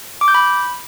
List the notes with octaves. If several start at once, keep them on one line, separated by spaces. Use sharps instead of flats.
D6
G6
B5